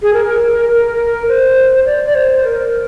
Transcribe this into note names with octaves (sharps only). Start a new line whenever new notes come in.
G#4
A#4
A#4
C5
D5
D5
C5
A#4